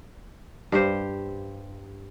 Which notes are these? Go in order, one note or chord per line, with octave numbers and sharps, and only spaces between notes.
G2 G4 C5